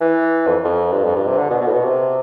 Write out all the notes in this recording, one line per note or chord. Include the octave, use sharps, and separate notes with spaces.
E3
F2
F2
G2
F2
G2
C3
D3
B2
B2
A2
B2
C3